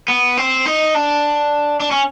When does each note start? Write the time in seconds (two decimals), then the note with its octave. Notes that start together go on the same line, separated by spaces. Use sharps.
0.08 B3
0.37 C4
0.66 D#4
0.94 D4
1.80 D4
1.91 C#4